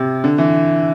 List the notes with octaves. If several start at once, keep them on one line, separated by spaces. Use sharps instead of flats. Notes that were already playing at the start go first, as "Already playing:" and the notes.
Already playing: C3
D3
E3